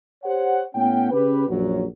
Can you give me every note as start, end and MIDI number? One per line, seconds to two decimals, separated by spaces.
0.24 0.62 67
0.24 0.62 72
0.24 0.62 73
0.24 0.62 78
0.75 1.10 45
0.75 1.10 59
0.75 1.10 61
0.75 1.10 78
0.75 1.10 79
1.11 1.45 49
1.11 1.45 61
1.11 1.45 67
1.11 1.45 71
1.49 1.83 34
1.49 1.83 42
1.49 1.83 54